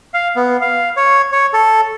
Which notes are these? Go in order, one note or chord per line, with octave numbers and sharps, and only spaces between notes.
F5
B3
F5
C#5
C#5
A4